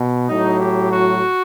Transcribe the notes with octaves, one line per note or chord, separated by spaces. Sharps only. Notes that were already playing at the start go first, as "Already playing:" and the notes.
Already playing: B2
A2 F#3 D#4
G4
F#4